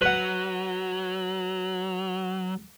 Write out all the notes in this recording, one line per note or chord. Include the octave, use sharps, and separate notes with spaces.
F#3 B4 F#5